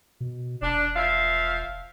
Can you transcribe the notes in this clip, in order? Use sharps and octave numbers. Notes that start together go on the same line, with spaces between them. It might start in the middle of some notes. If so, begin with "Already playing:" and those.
B2
E1 D4
F3 E5 F5